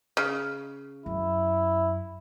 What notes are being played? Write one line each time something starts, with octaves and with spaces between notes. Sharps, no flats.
C#3
F#2 E4